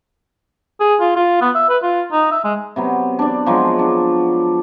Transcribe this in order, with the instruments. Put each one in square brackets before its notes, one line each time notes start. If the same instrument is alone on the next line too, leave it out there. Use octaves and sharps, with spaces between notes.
[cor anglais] G#4
F4
F4
B3
E5
B4
F4
D#4
E5
G#3
[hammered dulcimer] C3 F#3 B3
D4 D5
F3 F#3 G#3
D4